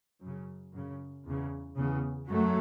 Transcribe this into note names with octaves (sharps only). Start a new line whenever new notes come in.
F#2 C#3
F#2 C#3
E2 C#3
E2 C#3
F#2 F#3 A3